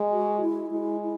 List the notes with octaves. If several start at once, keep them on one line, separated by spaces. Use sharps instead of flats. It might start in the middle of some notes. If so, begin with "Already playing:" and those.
Already playing: G#3
F#4
E4
G#3 E4
E4